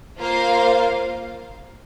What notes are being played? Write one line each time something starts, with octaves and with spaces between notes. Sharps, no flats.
A#3 F4 C5 F5